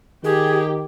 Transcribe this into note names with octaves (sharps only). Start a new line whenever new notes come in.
D#3 G4 G#4